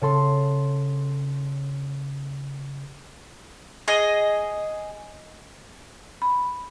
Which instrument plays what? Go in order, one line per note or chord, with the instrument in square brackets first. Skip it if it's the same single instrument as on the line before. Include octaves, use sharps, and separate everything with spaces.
[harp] C#3 A4 C6
[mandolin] G#4 D#5 G#5
[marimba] B5